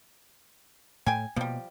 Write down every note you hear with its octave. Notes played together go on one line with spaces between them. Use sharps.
A2 G5 G#5
B2 F3 G3 A#3